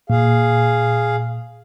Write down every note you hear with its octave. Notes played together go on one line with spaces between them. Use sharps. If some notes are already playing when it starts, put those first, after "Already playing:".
A#2 G#4 F5